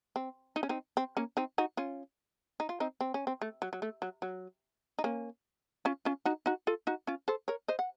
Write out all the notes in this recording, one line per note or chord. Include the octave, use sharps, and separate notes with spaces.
C4
D#4
C#4
C4 D#4
C4
A#3 C#4
C4 D#4
D#4 F#4
C#4 F4
D#4
F4
C4 D#4
C4
C#4
C4
A3
F#3
F#3
A3
F#3
F#3
D#4
A#3 C#4
C#4 F4
C#4 F4
D#4 F#4
D#4 F#4
F4 A4
D#4 F#4
C#4 F4
A4 C5
A#4 C#5
C5 D#5
F#5